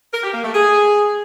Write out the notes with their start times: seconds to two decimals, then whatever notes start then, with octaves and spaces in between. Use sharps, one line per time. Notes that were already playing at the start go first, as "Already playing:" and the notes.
0.13 A#4
0.23 G4
0.34 A#3
0.44 A3
0.54 G#4